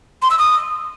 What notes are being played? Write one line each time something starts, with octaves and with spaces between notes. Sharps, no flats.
C6
E6
D#6